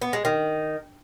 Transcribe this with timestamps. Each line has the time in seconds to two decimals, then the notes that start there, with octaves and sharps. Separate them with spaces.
0.01 B3
0.13 G#3
0.25 D#3